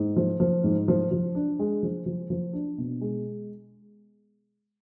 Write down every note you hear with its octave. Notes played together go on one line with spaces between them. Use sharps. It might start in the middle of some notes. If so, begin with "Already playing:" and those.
Already playing: G#2
F3
F3
G#2
F3
F3
D4
G#3
F3
F3
F3
D4
B2
G#3